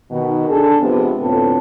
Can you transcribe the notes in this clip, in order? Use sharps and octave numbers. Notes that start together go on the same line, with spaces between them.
B2 D#3
D4 G#4 A4
C3 F3 G#3 B3
D2 A2 F3 B3 C4 A4